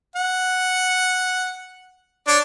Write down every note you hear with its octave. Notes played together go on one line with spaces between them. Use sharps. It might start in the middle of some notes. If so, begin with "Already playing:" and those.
F#5
D4 C#5 D5